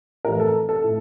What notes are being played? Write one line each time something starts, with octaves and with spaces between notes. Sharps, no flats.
A2 E3 A#4
A4
A4
A2